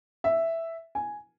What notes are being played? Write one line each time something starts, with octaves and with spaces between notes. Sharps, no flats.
E5
G#5